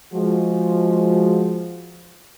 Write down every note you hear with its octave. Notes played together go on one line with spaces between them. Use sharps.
F3 G#3 F#4